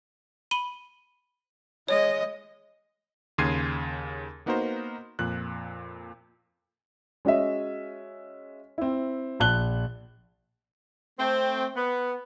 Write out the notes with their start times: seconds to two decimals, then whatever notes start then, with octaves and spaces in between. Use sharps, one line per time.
0.51 B5 D#7 G7
1.88 G#3 C#5 D#5
3.38 D#2 C#3 C6 G#6 C7 D#7
4.46 A#3 B3 D#4 F#4 A#4 C5
5.19 F2 A#2 F#6
7.25 G#3 C#4 F#4 D#5 E5
8.78 C4 E4
9.40 A#1 A5 F#6 G7
11.19 A3 C4
11.76 B3